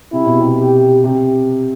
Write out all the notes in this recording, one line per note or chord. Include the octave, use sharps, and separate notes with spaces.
C3 E4
B2
C3
G4
C3